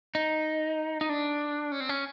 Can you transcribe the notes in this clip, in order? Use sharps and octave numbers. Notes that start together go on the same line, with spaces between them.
D#4
D#4
D4
C#4
C4
C#4